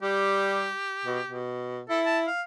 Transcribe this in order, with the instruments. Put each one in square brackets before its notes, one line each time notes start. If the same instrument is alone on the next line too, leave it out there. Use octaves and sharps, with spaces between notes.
[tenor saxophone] G3 [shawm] G4
[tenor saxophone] B2
B2
[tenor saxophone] E4 [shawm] A4
[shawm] A5
F5